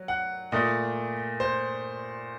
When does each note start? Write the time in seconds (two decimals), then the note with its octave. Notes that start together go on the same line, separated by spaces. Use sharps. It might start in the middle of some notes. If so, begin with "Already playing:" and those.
Already playing: F#3
0.08 F#5
0.52 A#2 A3 D#5
1.40 C5